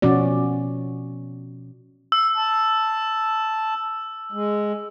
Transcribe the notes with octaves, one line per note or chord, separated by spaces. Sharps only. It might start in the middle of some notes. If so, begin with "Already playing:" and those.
B2 F3 C#4 F#4 D5
E6
A5
G#3